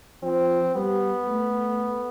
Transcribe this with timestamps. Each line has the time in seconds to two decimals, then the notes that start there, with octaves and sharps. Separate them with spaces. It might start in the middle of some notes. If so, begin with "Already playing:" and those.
0.23 F3 C4
0.75 G3 B3
1.27 A3